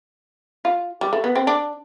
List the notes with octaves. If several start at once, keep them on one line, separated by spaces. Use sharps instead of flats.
F4
G3
A3
B3
C4
D4